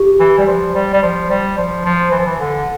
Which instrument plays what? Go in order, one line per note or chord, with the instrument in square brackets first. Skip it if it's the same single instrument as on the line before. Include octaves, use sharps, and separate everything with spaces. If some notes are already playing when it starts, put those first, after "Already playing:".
Already playing: [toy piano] G4
[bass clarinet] E3
G3
F3
G3
G3
F3
G3
F3
F3
E3
F3
E3
D3